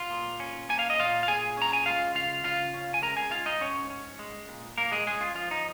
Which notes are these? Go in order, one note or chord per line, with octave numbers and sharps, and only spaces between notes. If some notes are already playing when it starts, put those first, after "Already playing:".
Already playing: F4
A#2
C#4
A#3 G#5
F5
D#5
A#2 F4 F5
F5
A#2 G#4 G#5
C#4 A#5
G#5
G#3 F4 F5
C#3 F4 F5
C#3 F4 F5
C#4
G#5
G#3 A#4 A#5
G#4 G#5
G#2 F4 F5
D#4 D#5
G#2 C#4 C#5
C#4
G#3
A#2
A#2 A#3 A#4
G#3 G#4
G#3 C#4 G#4
F4
F3 F4
D#4